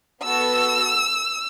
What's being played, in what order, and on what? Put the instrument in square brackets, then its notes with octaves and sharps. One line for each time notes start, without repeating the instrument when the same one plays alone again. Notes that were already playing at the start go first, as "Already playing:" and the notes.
[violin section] B3 F#4 A4 E6